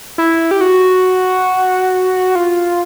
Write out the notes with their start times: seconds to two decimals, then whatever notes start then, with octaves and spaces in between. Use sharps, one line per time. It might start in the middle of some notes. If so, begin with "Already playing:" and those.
0.18 E4
0.51 G4
0.61 F#4
2.35 F4